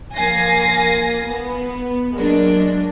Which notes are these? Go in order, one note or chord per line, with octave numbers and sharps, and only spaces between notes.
F3 A#3 F5 G#5 A#6 C7
B3
F#3 G#3 A#3 D4